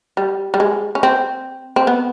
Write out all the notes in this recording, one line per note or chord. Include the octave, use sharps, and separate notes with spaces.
G3
G3
G#3
C#4
C4
C4
B3